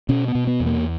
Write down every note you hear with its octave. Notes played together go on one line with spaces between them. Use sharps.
B2 C#4
B3
B2
B3
E2
A#3